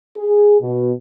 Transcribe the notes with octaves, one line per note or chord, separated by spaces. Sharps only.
G#4
B2